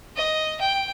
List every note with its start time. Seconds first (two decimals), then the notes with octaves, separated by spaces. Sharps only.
0.16 D#5
0.61 G5